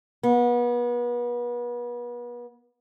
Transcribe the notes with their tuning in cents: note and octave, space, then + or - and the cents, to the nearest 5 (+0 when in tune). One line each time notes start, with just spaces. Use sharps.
B3 -35